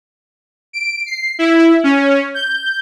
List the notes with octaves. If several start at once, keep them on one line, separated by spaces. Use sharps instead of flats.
D7
C7
E4
C#4
G6